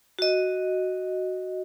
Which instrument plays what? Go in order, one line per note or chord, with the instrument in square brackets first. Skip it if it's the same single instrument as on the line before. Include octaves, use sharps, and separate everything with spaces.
[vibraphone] F#4 D#5